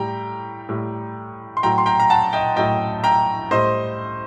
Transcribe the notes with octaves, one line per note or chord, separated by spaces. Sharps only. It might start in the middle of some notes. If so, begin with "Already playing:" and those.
Already playing: A2 G3 G5 A#5
A2 G3
C6
A2 F#3 G5 A#5
C6
G5 A#5
A#5
F#5 A5
D#5 G5
A2 F#3 D#5 G5
G5 A#5
A2 G3 C5 D#5